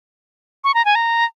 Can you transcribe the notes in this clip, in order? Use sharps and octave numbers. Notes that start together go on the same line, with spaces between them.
C#6
A#5
G#5
A#5